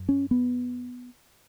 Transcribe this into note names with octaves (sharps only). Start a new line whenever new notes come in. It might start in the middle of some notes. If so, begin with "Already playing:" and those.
Already playing: F#2
C#4
B3